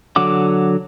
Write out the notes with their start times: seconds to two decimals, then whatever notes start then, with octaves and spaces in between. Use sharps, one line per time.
0.16 D3 F#3 F#5 D6